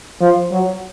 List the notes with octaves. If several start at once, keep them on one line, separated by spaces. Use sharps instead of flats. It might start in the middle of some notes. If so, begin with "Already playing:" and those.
F3
F#3